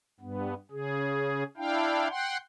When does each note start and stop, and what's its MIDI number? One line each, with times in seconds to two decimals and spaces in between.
0.20 0.54 43
0.20 0.54 59
0.71 1.44 49
0.71 1.44 68
1.57 2.08 62
1.57 2.08 64
1.57 2.08 77
1.57 2.08 79
2.09 2.37 78
2.09 2.37 79
2.09 2.37 84